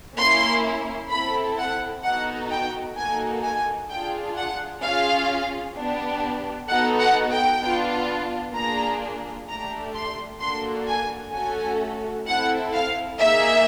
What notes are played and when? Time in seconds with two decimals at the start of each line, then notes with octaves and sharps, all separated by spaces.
0.18 A#3 C#4 E4 C6
1.10 C4 E4 A4 B5
1.58 F#5
2.03 B3 D#4 F#4 A4 F#5
2.51 G5
2.97 A#3 D#4 F#4 A4 G#5
3.43 G#5
3.89 D4 F4 G#4 G5
4.36 F#5
4.82 C#4 F4 G#4 F5
5.76 B3 D4 G4
6.69 B3 D#4 F#4 A4 F#5
6.99 F#5
7.31 G5
7.61 B3 D4 F4
8.55 A#3 D4 F4 G#4 A#5
9.47 A3 D4 G4 A#5
9.95 C6
10.40 A#3 D4 F#4 A4 C6
10.87 G#5
11.33 A3 C#4 F#4 A4 G#5
12.26 C4 E4 A4 F#5
12.73 F5
13.20 A#3 D#4 G#4 E5